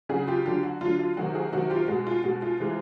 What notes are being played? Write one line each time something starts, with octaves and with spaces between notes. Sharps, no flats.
C#3 F#3 F#4 G#4
F4 G4
D3 F#3 F4 G4
F#4
D3 F#3 F4
F4
C3 D#3 F#3 F#4
F#4 G#4
C3 D#3 F#3 F#4
F4 G4
B2 G#3 F#4
F4
B2 G#3 F#4
F4
C3 E3 G#3